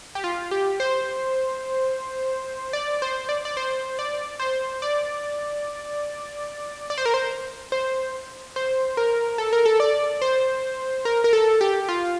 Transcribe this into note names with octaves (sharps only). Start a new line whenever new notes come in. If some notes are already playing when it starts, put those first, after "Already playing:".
G4
F4
G4
C5
D5
C5
D5
D5
C5
D5
C5
D5
D5
C5
A#4
C5
C5
C5
A#4
A4
A#4
A4
D5
C5
A#4
A#4
A4
G4
F4